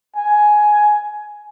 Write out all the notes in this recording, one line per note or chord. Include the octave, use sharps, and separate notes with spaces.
G#5